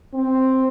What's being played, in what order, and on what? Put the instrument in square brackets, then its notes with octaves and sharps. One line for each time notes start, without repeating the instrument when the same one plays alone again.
[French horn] C4